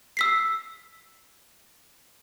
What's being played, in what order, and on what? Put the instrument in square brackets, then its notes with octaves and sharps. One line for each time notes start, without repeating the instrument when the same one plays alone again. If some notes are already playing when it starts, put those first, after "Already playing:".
[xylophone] E6 B6 C7